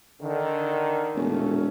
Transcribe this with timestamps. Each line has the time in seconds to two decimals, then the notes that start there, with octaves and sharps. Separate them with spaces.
0.21 D3 D#3
1.16 E1 A#2 A3 C#4